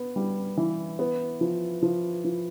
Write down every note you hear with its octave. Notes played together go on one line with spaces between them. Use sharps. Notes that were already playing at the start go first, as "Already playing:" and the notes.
Already playing: B3
G3
E3
B3
F3
F3
F3